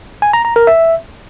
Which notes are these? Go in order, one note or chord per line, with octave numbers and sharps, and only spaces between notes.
G#5
A#5
A#5
A#4
E5